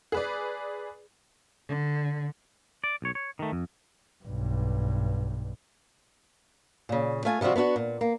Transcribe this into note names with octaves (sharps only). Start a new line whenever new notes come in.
G#4 B4 D5
D3
D5
B1 C#5
C#5
D#3 A3
F2
B1 G2
A#2 C#3
A3 F4 G#5
C3 F3 G3 C4 F#4
B3 D4 E4 F#4
A#2
A#3